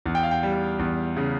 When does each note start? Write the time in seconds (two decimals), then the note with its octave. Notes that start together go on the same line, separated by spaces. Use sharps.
0.06 E2
0.15 G5
0.23 F5
0.31 G5
0.43 G3
0.79 E2
1.17 C#3